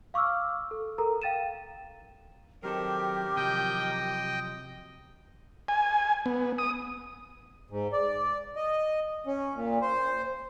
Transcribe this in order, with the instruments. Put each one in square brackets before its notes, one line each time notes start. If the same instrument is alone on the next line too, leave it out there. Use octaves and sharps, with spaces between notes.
[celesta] F5 C#6 D6 E6 F6
A4
A4 A#4 A#5
F5 G5 A6 D#7 E7
[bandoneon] D#3 A#4 [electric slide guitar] F#3 C4 A4 [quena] G4
[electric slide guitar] C3 F3 F#3 [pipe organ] D#5 G5
[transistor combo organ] G#5
B3
D#6
[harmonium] G#2
D5
D#5
C#4
A#2
C5